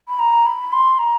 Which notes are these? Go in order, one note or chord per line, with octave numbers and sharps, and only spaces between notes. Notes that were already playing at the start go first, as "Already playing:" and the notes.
B5
A#5
B5
C6
A#5